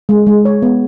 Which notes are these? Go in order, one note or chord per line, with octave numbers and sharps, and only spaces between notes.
G#3
G#3
C#5
B3